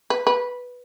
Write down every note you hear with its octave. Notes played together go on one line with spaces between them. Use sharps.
B4
B4